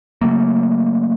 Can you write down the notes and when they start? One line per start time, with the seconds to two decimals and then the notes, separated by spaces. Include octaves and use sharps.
0.21 C#3 F#3 A3 A#3